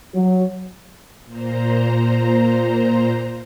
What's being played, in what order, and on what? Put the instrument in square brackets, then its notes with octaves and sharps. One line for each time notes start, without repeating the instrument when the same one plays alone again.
[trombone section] F#3
[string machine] A#2 C5 A#5